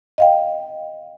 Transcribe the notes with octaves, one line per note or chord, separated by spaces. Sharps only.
D#5 F5 G5